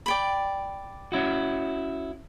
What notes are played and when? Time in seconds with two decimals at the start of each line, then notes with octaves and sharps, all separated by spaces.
0.06 D5 G5 B5
1.12 C#4 E4 F#4